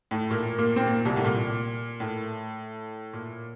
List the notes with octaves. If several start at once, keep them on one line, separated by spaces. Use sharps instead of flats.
A2 A3
A#2 A#3
A#2 A#3
C4
A#2 A#3
C2 C3
A2
A#2
A2
A#2